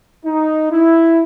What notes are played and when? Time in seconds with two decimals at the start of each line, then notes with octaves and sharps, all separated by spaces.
0.25 D#4
0.72 E4